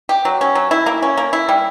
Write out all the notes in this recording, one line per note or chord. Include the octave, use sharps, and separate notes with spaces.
G4
F#3
C#4
F#3
E4
A#3
C#4
A#3
E4
G3